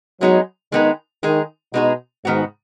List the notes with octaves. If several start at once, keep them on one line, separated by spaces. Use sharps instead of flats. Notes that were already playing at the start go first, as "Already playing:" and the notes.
F#3 G#3 B3 D#4 G#4
D#3 G#3 B3 D#4 G#4
D#3 G#3 D#4 G#4
B2 G#3 D#4 G#4
G#2 D#3 B3 F#4